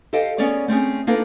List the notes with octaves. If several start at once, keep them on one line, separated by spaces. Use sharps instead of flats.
G4 A4 C5 D#5 F5 G5
B3 C#4 G#4 C#5 D5
A3 C4 C#4 G#4
A#3 D4 D#4 F4 A4 B4